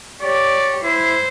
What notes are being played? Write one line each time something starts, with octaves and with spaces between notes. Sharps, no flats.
G4 C#5 D5
E4 C5